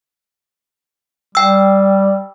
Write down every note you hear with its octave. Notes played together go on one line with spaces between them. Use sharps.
G3 G5 E6